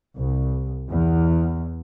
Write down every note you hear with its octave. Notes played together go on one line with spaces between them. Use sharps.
C2
E2